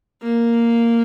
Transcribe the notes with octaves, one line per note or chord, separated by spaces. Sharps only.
A#3